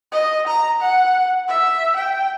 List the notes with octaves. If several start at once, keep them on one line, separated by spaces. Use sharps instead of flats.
D#5
A#5
F#5
E5
G5